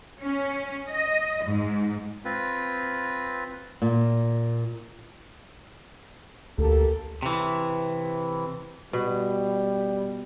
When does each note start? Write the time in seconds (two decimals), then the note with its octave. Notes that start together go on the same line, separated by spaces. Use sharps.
0.21 C#4
0.88 D#5
1.44 G#2
2.25 C4 F4 B4
3.82 A#2
6.58 D2 A#3 G4 A4
7.22 C3 E3
8.93 B2 G3